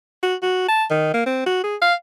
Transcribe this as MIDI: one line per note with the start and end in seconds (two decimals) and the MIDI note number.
0.23 0.35 66
0.43 0.66 66
0.69 0.85 81
0.90 1.14 51
1.14 1.26 58
1.26 1.42 60
1.46 1.63 66
1.64 1.76 68
1.82 1.94 77